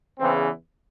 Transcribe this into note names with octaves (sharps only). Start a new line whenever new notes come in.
E2 C#3 E3 C4